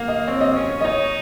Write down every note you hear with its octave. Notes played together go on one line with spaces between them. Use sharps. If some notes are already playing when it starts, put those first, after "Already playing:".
Already playing: A#3 F5
D#5
C4 C#5
D#5
C#4 C#5
D#5
D#4 C#5